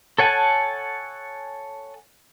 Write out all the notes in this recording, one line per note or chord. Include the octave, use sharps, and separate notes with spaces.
A4 C#5 F#5 G#5 A5